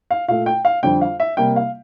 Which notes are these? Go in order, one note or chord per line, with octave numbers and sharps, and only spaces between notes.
F5
A#2 A3 F5
G5
F5
F2 D3 G3 G5
F5
E5
C3 G3 A#3 G5
F5